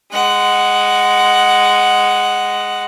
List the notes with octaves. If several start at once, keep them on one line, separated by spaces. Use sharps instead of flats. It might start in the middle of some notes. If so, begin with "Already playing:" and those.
G#3 F#5